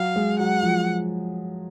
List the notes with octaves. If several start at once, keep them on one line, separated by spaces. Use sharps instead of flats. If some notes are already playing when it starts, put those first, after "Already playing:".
Already playing: F#3 F5
G#3
F#3 F#5
F3